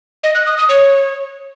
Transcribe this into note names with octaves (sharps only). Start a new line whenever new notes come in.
D#5
F#6
D#6
D#6
C#5